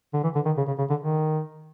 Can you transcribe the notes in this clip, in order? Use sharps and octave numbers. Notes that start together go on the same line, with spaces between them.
D3
E3
D3
D#3
C#3
C#3
C#3
D3
D#3